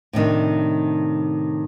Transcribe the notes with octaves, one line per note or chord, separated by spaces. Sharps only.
A2 C3 D#3 D4